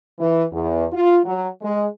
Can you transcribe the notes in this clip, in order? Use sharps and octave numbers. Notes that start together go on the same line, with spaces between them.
E3
E2
F4
F#3
G#3